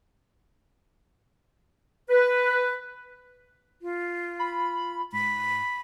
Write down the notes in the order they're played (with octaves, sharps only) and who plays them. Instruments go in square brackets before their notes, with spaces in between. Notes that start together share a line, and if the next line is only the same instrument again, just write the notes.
[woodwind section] B4
[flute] F4
[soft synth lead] B5
[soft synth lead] G#2 [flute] B5